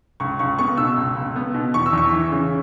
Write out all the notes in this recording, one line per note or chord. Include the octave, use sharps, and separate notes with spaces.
C#2 C#6
C#2 C#6
B3 C#6
B2 E6
C#2
C#2
B3
B2
E2 C#6
E6
E2
C#6
E3
C#3